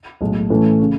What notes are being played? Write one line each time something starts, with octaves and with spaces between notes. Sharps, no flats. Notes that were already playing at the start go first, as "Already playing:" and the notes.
B1 A2 G#3
A2 E3 A3 C#4
C#3